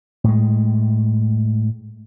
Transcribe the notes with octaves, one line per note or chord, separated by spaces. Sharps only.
A2 G#3